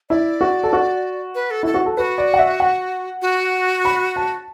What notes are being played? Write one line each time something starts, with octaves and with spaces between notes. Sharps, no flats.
E4 D5
F#4
A4
F#4
B4
A4
E4 A4
F#4
A4
F#4 B4
D5
F#5
E5
F#5
F#4
B5
A5